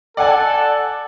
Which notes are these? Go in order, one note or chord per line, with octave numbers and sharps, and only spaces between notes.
A4 D5 F#5 G#5